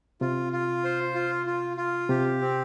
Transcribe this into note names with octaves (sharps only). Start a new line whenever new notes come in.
C3 F4
F4
C5
F4
F4
F4
C3 G4
C4